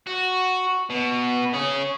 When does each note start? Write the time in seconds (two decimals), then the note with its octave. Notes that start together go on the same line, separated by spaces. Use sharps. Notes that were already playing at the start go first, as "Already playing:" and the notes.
0.07 F#4
0.90 B2
1.54 C#4 G#4